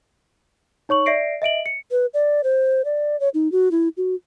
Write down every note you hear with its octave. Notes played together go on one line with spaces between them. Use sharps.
D#4 C#5 C#6 F#7
D5 E5 A#6 C7 D7
D#5 E5 D7 F#7
C#7
B4
D5
C5
D5
C#5
D#4
F#4
E4
F#4